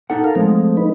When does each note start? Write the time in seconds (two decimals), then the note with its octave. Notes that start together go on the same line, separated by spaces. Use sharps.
0.10 D#4 A4 F#5
0.24 A4 A#4 F5
0.35 F3 G#3 A3 C4
0.77 D#4 B4